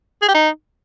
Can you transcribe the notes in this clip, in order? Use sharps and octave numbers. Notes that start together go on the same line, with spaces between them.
G#4
G4
D#4